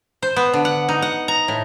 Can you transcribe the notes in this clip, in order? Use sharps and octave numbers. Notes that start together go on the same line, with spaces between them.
C5
B3
D3
F#5
D#4
F#5
A#5
A2